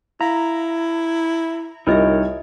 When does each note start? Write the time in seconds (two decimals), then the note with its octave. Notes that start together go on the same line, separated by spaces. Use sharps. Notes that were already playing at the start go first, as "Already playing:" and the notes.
0.21 E4 F5 A#5
1.87 C2 D#4 F4 A#4 C#5 D#5 E5